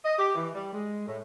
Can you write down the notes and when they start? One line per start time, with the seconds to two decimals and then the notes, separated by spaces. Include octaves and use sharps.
0.05 D#5
0.18 G4
0.35 E3
0.54 G3
0.73 G#3
1.07 A2